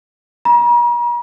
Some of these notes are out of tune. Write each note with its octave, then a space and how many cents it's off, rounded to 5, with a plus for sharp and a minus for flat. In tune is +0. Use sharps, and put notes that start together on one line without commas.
A#5 +45